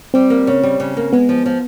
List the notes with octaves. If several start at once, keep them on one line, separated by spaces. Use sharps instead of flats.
G3 C4
A#3
C#3
G3
C#3
A#3
G#3 B3
F3
F3